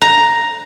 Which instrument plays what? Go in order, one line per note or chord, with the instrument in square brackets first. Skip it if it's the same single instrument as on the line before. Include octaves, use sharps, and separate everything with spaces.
[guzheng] A#5